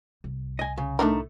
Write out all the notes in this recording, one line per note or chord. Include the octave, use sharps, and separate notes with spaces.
C2
D#5 G#5
C#3
A2 A3 D4 D#4 A#4